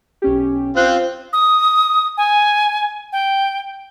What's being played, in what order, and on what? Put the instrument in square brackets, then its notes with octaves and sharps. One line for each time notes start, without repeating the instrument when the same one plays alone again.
[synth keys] B1 C#4 G4
[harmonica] C4 F4 [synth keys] F#6 G6
[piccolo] D#6
G#5
G5